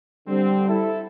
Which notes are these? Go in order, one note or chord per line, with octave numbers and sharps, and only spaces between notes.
D3 G3 C4
E4 A4